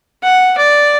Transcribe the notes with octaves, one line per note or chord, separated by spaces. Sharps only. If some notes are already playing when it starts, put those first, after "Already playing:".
F#5
D5